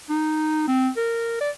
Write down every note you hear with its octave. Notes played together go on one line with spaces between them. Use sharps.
D#4
C4
A#4
D5